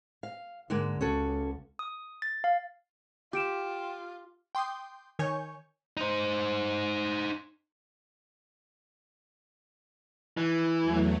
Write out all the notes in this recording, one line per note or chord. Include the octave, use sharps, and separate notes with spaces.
F5
G#2 D3 G#3 A#3
C#2 C#4 F#4 A4
D#6
A6
F5
F4 G4 G5 D7 E7
G5 C6 D6 D#6 G6
D#3 C#5 G#5 C#6 G6
D#4 C5
E3
E2 F#3 A3